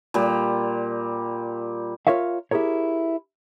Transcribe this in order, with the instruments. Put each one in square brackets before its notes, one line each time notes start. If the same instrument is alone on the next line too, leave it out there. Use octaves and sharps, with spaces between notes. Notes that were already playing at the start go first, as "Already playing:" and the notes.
[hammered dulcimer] A#2 G3
[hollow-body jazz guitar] F4 A#4 C#5 E5 F5
E4 G4 G#4 A#4 C#5